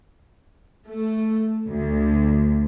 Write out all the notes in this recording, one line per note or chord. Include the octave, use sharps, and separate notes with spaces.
A3
D2